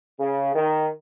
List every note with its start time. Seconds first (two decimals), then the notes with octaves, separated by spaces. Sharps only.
0.19 C#3
0.55 D#3